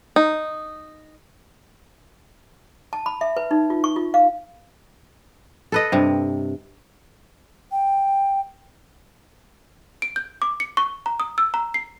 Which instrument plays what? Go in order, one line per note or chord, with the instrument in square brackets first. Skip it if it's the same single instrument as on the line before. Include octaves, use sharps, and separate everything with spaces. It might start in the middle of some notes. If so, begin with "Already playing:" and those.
[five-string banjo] D#4
[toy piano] A5
B5
E5
B4
D#4
F4
C#6
F4
F5
[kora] A4 B4 D#5
G2 C3
[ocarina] G5
[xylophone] D7
G6
D6
C#7
C#6
A#5
D#6
E6
A#5
C7